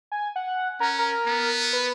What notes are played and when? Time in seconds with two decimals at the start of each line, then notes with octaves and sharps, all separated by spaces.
0.12 G#5
0.36 F#5
0.80 C#4 A#4
0.99 A#4
1.27 B3
1.73 B4